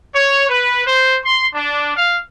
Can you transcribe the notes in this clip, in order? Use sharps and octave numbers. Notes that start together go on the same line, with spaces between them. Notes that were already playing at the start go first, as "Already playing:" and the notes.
C#5
B4
C5
C6
D4
F5